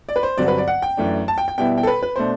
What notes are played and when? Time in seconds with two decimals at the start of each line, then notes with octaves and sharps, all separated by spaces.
0.09 D5
0.16 B4
0.23 C5
0.38 G2 D3 F#3 C4 D5
0.48 B4
0.58 D5
0.68 F#5
0.82 G5
0.97 F#2 E3 A3 D4
1.28 A5
1.38 G5
1.48 G5
1.58 B2 G3 B3 E4 G5
1.78 G5
1.83 A4
1.87 B4
2.03 B4
2.16 B2 A3 D4 C5